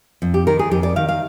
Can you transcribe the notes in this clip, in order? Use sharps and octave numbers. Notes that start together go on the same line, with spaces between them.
F2
G4
D#3 A#4
G#4
F2 G4
D5
D#3 F5
F5